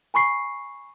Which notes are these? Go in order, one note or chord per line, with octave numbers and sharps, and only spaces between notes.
G#5 B5 C#6 C7